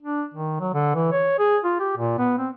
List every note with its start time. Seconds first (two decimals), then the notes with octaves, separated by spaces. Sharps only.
0.02 D4
0.34 D#3
0.60 F#3
0.74 D3
0.95 E3
1.12 C#5
1.39 G#4
1.64 F4
1.80 G4
1.97 A#2
2.18 B3
2.38 C4